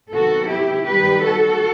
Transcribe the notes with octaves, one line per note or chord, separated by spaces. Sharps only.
C3 D#3 F#3 B3 F#4 A4
E4 G4
D#3 G3 B3 G4 B4
F#4 A4